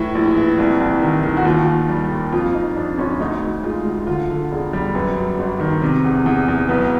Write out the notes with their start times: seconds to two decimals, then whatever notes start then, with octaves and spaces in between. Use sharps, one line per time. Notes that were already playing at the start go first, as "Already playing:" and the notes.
Already playing: A2 E3 E4
0.15 A#1
0.37 E3
0.59 C2
0.80 C2
1.02 D#3
1.23 D#3
1.37 F#4
1.45 D#2 F4
1.67 D#2
1.89 G3
2.12 D#2
2.32 F2 F4
2.54 F2 D#4
2.76 F2 D4
2.98 G1 C#4
3.20 D2 D#4
3.43 D2
3.63 G#3 F4
3.85 D2
4.07 D3 F4
4.29 D3
4.52 E1
4.73 G3
4.95 F#2 B3
5.17 F#2
5.39 G1
5.60 D#3
5.82 C3
6.04 E2
6.26 E2
6.48 E2
6.69 B1 B3